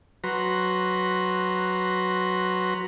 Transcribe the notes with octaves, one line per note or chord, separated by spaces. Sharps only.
F#3 F#4 B4 A#5 C6